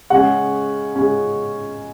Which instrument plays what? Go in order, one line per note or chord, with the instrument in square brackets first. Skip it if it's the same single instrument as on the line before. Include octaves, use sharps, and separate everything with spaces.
[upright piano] C#3 G#3 C#4 F#5
C#3 G#3 C#4